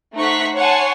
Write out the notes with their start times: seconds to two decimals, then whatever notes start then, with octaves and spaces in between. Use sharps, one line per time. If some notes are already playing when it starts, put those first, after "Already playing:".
0.16 A3 D#4 C5 F#5 C#6 B6
0.57 C#5 F#5 G#5 A5 C6